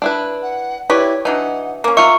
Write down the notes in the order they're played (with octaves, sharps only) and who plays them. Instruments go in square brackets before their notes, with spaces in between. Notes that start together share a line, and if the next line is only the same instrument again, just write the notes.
[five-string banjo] D4 E4 B4
[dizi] F#5
[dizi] E4 [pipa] G4 B4 D5 [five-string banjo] C#5
[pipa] E3 F#3 D4 [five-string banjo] D#4 [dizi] F#5
[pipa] A#3 C#4 [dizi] D6
[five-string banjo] F4 E5 [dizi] A#5 [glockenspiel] C#6 C#7